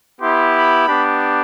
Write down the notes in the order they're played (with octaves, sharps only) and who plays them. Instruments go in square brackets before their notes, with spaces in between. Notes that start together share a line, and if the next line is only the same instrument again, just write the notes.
[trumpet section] B3 E4 G4 C6
B5
B3 D4 G4